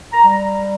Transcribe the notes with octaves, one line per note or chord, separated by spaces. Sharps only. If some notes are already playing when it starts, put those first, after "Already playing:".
A#5
G3